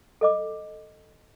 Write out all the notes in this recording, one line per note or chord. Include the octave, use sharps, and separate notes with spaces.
A4 D#5 D6